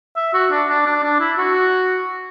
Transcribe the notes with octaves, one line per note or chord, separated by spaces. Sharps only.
E5
F#4
D4
D4
D4
D4
E4
F#4